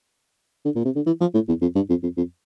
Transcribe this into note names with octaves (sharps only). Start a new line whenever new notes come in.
D3
A#2
C3
D3
E3
F3
A2
E2
F2
G2
F2
F2
F2